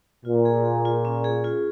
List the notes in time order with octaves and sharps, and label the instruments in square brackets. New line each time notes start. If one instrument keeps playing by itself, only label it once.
[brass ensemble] A#2 [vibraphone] F4
[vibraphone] G#4
G#4
F4
C#4
G#4
F4